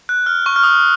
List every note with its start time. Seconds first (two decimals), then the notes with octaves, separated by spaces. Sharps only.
0.09 F#6
0.26 F6
0.46 C#6
0.56 F6
0.64 D#6